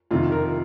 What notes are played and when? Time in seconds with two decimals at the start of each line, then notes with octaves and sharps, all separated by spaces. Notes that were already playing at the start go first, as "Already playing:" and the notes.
0.11 F2 C3 D#3 F4
0.32 A#4